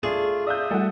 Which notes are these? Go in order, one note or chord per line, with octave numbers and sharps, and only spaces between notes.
A3 D4 F4 G#4 G#5
D5 E5 F5 D#6 G6
G3 A3 A4 F#5